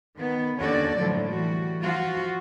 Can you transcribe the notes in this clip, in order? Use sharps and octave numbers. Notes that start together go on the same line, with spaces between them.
D#3 B3
D#2 D3 C#4 F#4 A4 D5
A2 D3 F3 F#3
E3 G3 F#4
F3 F4 F#4